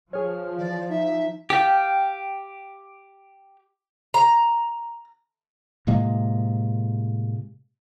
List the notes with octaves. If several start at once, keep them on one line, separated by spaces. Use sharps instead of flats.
F3 G#4 C#5 F6
E3 D5
D#4 E5
G4 F5 G5 A5
A#5
A2 C3 G#3 A#3